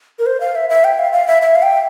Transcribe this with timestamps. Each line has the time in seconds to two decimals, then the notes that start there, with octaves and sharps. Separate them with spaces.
0.19 A#4
0.26 C5
0.41 F5
0.55 E5
0.70 E5
0.84 G5
0.99 F5
1.13 F5
1.27 E5
1.42 E5
1.56 F5
1.63 G5